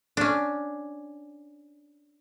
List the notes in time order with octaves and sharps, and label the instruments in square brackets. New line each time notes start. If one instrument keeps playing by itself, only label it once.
[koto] C#4 D4